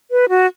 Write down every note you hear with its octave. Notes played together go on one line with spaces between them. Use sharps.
B4
F#4